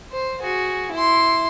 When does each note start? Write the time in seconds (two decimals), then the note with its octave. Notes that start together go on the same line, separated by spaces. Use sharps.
0.11 C5
0.41 F#4 G#4
0.92 E4 C6